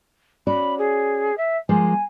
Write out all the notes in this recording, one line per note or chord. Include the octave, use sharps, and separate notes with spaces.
C#4 F#4 D5 B5
G#4
E5
F3 G#3 A#3 G#5